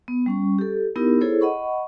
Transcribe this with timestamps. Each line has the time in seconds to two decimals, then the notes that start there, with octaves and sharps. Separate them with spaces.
0.08 B3
0.26 G3 C#4 C#6
0.58 G4 A4
0.96 B3 D#4 E4 G4 A#4
1.21 E4 G#4 A4 C5 C#5
1.41 D#5 F#5 B5 C#6